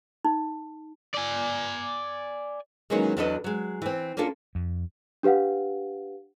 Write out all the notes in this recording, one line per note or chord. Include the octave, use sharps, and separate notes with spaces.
D#4
D5 G#5
D#3 E3 F#3 G#3 A#3 C#4
E2 F#3 D4 A4 B4 D#5
F#3 G#3
E3 C4
A#3 C#4 D4 F4 A4
F2
D4 G4 B4 F5 F#5